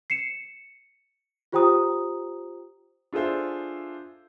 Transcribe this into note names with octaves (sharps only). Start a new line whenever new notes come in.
C7 C#7 E7
F4 G4 C5 G5 A#5 D#6
D4 F4 G#4 A4 C5 E5